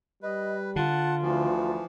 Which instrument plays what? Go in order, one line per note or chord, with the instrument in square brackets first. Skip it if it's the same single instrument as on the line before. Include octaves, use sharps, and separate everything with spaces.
[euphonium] G3 [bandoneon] B4 [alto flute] D#5
[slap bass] D3 [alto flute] F4 [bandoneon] F#5 A5
[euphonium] D2 [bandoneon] E3 F3